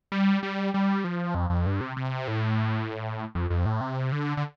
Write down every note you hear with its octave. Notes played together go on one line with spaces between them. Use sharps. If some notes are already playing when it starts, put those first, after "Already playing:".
G3
G3
G3
F3
F2
F2
G2
C3
C3
A2
F2
F2
A2
C3
D3
D3